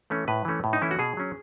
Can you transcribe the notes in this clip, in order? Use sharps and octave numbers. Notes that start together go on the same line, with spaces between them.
E3 A3 C#4
A2 B4
E3 A3 C#4
A2
D#4
E3 A3 C#4 E4
F#4
B2 G#4
F#3 C#4